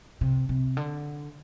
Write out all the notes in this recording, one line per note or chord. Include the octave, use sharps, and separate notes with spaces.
C3
C3
D3